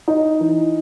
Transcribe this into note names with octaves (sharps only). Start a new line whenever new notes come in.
D#4
E3